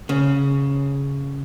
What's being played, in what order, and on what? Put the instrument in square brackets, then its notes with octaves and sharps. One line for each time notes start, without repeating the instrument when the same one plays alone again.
[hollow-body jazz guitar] C#3